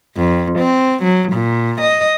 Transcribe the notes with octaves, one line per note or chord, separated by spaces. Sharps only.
F2
C4
F#3
A#2
D#5